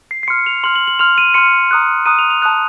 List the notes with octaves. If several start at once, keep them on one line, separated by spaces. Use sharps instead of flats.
C7
C7
C6 F6 C#7
F7
C6 F6 F#7
F#7
F#7
C6 F6 F7
D#7
C6 F6 C#7
A#5 D#6 F#6
A#5 D#6 F#6 D#7
F7
F7
A5 D#6 F#6